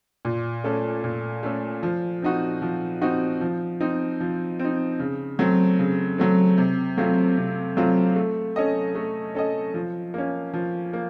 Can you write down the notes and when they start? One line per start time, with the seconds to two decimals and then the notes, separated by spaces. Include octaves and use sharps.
0.25 A#2
0.64 A3 C#4 A4
1.04 A#2
1.43 A3 C#4 A4
1.83 F3
2.22 C4 D#4 F#4
2.62 F3
3.01 C4 D#4 F#4
3.41 F3
3.80 C4 D#4
4.20 F3
4.59 C4
4.64 D#4
4.99 C#3
5.39 F#3 A3 C4
5.79 C#3
6.18 F#3 A3 C4
6.58 C3
6.97 F#3 A3 C4 F4
7.37 C3
7.77 F#3 A3 C4 F4
8.16 A3
8.56 C#4 A4 D#5
8.95 A3
9.35 C#4 A4 D#5
9.74 F3
10.14 A#3 C#4
10.54 F3
10.93 A#3